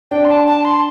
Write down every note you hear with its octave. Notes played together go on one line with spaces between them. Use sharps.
D4 G5
C6
A5
A5
C6